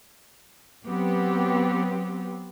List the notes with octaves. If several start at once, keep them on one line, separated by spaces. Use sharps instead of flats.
F#3 B3 C4 G4